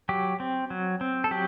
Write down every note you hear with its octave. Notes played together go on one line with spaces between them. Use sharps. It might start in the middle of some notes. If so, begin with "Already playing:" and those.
F#3 G4
C4
F#3
C4
A4
F#3 G4